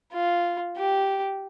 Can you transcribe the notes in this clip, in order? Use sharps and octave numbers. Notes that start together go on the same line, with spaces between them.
F4
G4